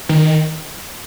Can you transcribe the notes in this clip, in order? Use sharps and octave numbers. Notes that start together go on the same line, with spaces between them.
D#3